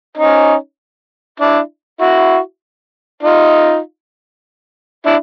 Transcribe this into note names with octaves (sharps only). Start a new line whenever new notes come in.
C#4 D#4
D4 E4
E4 F#4
D#4 F4
D4 E4